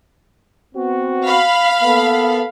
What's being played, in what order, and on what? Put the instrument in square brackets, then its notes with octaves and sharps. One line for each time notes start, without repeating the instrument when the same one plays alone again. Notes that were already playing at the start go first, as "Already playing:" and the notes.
[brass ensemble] B3 C4 F#4
[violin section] F5 B5
[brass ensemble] A#3 B3 A4